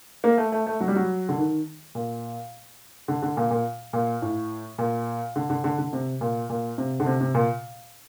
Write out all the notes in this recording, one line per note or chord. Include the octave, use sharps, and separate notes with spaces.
A#3
A3
A3
A3
F#3
G3
F#3
D3
D#3
A#2
D3
D3
A#2
A#2
A#2
A2
A#2
D3
D3
D3
D3
C3
A#2
A#2
C3
D3
C3
C3
A#2